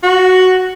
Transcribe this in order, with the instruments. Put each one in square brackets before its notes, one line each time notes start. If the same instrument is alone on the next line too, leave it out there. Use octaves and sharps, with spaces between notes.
[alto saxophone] F#4